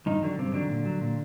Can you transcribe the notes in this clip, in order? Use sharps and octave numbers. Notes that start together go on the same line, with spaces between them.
G2 D#3 D#4
D3 D#3 F#3 D4
G2 C3 C4
D3 D#3 F#3 D4
A#2
F#3
A#2